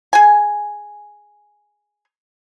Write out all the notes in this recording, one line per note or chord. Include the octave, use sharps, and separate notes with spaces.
G#4 G#5